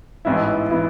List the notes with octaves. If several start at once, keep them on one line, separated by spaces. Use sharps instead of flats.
A1 G#2 E3 B3 E4
E3 B3 E4